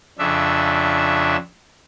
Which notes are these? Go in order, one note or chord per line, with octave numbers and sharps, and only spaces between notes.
F2 C#3 D4 E5